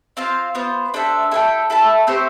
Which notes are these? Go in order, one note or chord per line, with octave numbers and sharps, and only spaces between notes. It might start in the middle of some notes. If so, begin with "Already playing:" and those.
C4 F4 C5 F5
B3 F4 C5
D4 A4 C5 E5
E4 A4 E5 G5
E4 A4 E5 A5
A3 C4 G4 C5